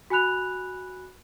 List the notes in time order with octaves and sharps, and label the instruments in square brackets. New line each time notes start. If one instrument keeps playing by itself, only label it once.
[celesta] F#4 G#5 B5 F#6 F7